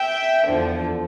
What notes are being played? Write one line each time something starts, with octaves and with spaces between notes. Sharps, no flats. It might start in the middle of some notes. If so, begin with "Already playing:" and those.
Already playing: E5 G5
E2 D3 F3